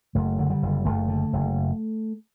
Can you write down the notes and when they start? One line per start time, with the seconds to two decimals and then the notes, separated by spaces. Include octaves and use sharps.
0.15 F#1 A3
0.39 D3
0.50 G3
0.62 F#1
0.85 F#1 A3
1.08 D3
1.33 F#1